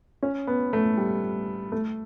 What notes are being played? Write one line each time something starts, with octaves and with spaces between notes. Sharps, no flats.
C#4
B3
A3
G3
A3